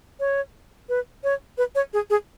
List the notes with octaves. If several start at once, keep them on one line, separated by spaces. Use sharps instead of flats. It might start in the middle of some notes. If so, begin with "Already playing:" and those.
C#5
B4
C#5
B4
C#5
G#4
G#4